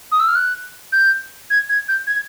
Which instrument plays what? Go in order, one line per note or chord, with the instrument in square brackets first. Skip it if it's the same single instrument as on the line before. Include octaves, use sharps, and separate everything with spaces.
[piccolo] D#6
E6
F6
F#6
G6
G#6
G#6
G6
G#6